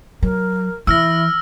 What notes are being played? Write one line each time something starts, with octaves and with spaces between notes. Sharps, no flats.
F#3 A#4
E3 E4 E6 F6 A#6